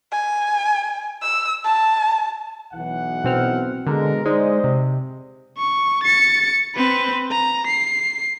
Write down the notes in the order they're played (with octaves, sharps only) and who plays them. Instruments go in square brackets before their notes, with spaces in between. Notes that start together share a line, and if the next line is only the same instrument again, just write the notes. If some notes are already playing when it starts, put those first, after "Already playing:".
[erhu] G#5
E6
A5
[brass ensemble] B1 E3 F#5
[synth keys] B2 C4 F6
[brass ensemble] B2 G#3 A#4 [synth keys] D3
[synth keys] G#3 D#4 [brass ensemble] C5 D5 D#5
[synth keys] C3
[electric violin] C#6
A6 C#7
C4 B4
A#5
C7